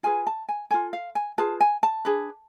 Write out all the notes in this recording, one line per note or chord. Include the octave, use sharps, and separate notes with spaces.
F4 G#4 B4 G#5
A5
G#5
F4 A4 G#5
F5
G#5
F4 G#4 B4 A5
G#5
A5
D4 G#4 B4